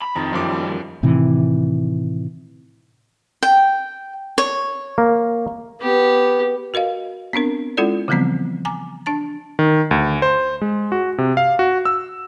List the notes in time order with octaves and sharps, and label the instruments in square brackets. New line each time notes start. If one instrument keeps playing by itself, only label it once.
[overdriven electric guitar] B5
[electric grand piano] F2 A#5 [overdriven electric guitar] D#3
[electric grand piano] F#2 F3 D6 [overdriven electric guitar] D#3 G3
[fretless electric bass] A2 C3 D#3 E3
[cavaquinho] G5
C#5
[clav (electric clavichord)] A#3
[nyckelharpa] B3 G4
[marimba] F#4 A#4 D#5 F5
B3 C4 D4 A#4
G#3 C#4 E4 F4 A4 D5
C#3 E3 F3 G3 B3 C4
G#5 A#5 D6
D4 A5 A6
[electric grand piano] D#3
D2
C5
G#3
F#4
C3
F5
F#4
E6